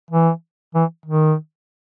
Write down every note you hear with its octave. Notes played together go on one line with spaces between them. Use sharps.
E3
E3
D#3